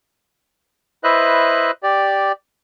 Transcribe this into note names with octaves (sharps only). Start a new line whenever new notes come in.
E4 B4 C5 D#5 E5 F#6
G4 D5